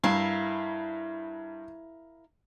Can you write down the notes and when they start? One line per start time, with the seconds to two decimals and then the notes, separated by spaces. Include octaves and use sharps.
0.04 G2 E4 A#4 F5